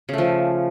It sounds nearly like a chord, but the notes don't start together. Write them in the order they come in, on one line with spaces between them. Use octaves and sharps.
C#3 A3 F3